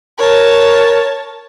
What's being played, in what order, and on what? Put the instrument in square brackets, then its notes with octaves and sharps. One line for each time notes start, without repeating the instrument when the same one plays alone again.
[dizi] A#4 [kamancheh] C#5 A5